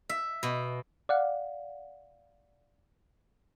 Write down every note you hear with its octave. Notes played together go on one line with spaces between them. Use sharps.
E5
B2
D5 F5 F#5